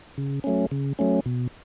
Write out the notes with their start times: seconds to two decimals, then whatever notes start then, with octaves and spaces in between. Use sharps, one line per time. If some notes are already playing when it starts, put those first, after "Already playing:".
0.18 C#3
0.44 F#3 A3 C#4
0.71 C#3
0.99 F#3 A3 C#4
1.26 B2